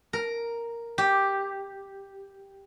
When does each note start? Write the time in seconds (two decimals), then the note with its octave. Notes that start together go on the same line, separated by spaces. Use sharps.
0.13 A#4
0.98 G4